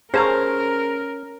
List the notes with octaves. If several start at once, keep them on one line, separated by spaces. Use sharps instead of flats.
C#4 G#4 A#4 C5 A5 A#5